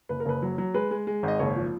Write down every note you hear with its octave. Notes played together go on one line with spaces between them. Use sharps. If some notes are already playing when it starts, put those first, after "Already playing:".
F#1 B4
A#4
F#1 B4
F#3
F#3
G#3 B4
G#3
G#3
G#1 D#5
F#1 C#5
F3